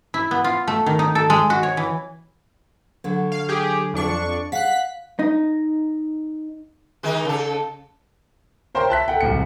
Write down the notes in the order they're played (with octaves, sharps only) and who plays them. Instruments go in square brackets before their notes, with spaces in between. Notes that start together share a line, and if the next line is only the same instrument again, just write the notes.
[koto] E4
B3
F4
A3
D#3
D#4
A4
G#3
F#4
C#5
E3
[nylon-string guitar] D3 F#3
[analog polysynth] F5
G4 G#4
F2 D4 C#6
[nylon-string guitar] F5 F#5 [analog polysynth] F#6 B6
[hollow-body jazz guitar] D#4
[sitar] D#3 G#3 D#4
C#3 A4
[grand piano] A#4 C5 C#5 G5 A#5 C6
E5 A5 F#6 B6
A4 F#5 G5
D1 C2 C#7